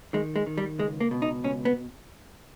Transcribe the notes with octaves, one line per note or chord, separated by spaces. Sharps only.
D#3 G#3
G#3
D#3
G3
C#2 G#3
A#3
B2
D#4
C#2 C#4
B3